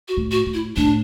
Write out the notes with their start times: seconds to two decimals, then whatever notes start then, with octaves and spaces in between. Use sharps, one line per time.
0.08 F#4
0.17 A2
0.31 F#4
0.46 A2
0.54 E4
0.76 A2 D4